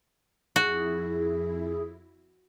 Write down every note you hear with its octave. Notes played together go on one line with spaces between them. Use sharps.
F2 E4 F#4 G#4